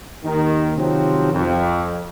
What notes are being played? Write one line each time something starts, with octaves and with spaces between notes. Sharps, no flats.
D#2 D#3
C3 D#3 F3 F#3 C4
F2